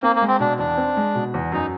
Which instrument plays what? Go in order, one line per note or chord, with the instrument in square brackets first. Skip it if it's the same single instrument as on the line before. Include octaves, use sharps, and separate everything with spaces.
[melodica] A#3 [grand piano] C4
[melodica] A#3
[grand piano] G#3
[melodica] C4
[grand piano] B2 [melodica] D4
[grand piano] E2 [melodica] D4
[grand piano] C4
G#3
B2
E2
[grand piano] F#2 [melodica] D#4